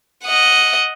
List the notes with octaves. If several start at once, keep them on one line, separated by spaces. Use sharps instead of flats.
D#5 F#5